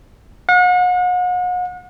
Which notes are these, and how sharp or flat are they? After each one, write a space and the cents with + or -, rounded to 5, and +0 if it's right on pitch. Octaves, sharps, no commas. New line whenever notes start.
F#5 -40